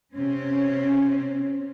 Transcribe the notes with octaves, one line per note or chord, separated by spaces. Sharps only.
C3 C4 C#4